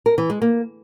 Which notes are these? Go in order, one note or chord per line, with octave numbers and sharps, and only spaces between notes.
A#4
E3
G#3
A#3